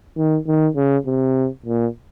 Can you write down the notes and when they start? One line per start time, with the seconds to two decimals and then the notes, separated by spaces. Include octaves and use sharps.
0.17 D#3
0.47 D#3
0.76 C#3
1.06 C3
1.66 A#2